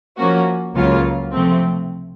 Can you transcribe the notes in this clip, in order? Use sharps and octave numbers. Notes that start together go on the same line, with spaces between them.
F3 A#3 C#4 F#4
C#2 C#3 F#3 A#3 F4
C3 F3 A3 C4